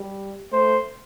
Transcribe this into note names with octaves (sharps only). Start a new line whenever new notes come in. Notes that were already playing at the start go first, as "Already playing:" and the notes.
Already playing: G3
A3 C5